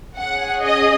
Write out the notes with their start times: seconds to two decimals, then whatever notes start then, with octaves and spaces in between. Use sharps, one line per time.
0.18 C#4 G#4 F#5
0.63 D#5